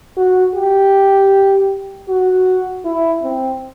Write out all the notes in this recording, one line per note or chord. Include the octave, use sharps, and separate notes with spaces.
F#4
G4
F#4
E4
C4